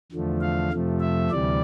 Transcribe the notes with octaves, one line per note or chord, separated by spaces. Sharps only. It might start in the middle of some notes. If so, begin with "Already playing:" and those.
E2 D3 F3 A3
F5
F2 C3 F3 A3
E5
D2 C3 E3 G3 D5